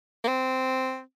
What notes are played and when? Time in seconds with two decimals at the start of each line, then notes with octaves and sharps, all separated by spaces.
0.24 A#3
0.28 C4